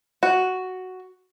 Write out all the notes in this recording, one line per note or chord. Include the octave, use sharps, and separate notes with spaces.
F#4